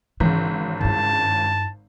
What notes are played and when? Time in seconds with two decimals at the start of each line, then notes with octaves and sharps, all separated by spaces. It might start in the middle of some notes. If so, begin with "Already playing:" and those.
0.20 G#1 C#3 E3
0.81 G2 E4 A5